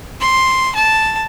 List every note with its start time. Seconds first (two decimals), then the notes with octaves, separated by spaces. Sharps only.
0.21 C6
0.76 A5